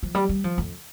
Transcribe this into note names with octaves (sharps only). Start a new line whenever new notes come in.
F3
G3
G3
F3
F2